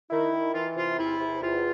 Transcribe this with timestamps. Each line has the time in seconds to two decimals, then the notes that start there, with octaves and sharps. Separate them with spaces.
0.10 D#3 E4
0.32 D#3
0.54 E3 F4
0.76 C3 F4
0.98 E2 E4
1.20 C3
1.41 E2 F4